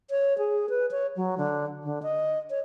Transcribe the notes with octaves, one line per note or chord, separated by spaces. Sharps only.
C#5
G#4
B4
C#5
F#3
D3
D3
D#5
C#5